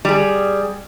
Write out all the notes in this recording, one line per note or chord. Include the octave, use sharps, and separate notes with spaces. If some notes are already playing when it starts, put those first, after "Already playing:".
G3 G#4